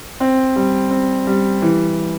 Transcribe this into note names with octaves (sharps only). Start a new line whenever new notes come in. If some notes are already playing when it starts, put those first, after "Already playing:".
C4
G3
C4
G3
E3